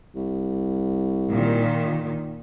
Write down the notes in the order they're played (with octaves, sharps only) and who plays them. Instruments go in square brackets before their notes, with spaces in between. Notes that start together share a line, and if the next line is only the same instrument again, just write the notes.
[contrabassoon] C2
[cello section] A#2 D#3